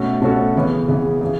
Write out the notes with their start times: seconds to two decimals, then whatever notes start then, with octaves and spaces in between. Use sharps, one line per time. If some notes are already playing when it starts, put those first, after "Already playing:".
Already playing: B2 A3 C#4 F#4 A4
0.22 B2 A3 C#4 F#4 A4
0.56 C#3 E3 B3
0.88 C#3 E3 B3
1.21 C#3 E3